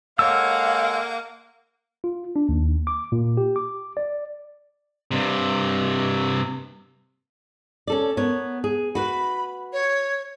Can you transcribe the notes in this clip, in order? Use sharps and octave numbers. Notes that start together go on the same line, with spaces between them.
G#3 A#3 A4 C#5 F5 F#5 G#5 E6
F4
D4
D#2
D6
A#2
G4
D6
D5
G2 C3
C#4 A4 D5
B3 A#4 C#5
G#4
F#4 B4 B5
C#5